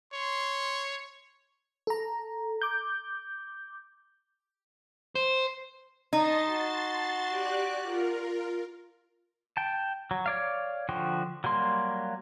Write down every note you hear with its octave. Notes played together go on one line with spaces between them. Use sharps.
C#5 C6
A4 A#5
D6 G6
C5
D#4 A5 C6 A6
F#4
G4 D5 F#6
F4 A#4
G5 A5
F#3
C#5 D5 F5
D3 F3 F#4 G5
F#3 G3 A#3 C6